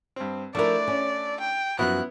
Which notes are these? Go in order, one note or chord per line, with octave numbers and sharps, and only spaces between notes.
G2 C4
F3 A3 D4 E4 A#4 D5
C#4
G5
F#2 F3 B3 E4 F#4 F#6